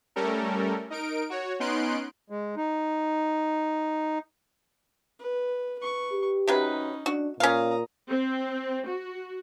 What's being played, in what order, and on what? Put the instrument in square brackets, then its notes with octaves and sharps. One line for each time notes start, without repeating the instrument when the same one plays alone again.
[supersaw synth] G3 A3 C#4 A4 A#4
D#4 A#4 D7
F#4 C#5
B3 C#4 D#4 C6 F#6 D7
[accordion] G#3
D#4
[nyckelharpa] B4
B4 C#6
[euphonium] G4
[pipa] C3 F#3 B4 [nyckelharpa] C#4 D#4
[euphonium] D4 [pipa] F#4
[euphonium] A#2 [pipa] C#4 F5 [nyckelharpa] A#5 D#6
[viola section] C4
F#4